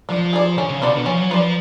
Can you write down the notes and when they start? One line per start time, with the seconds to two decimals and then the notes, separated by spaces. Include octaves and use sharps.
0.09 F3 D4
0.33 G#4 D5
0.58 D3 C#4
0.70 C#3
0.82 B2 F4 B4 D5
0.94 D3
1.06 F3 C#4
1.18 F#3
1.30 F3 F4 B4 D5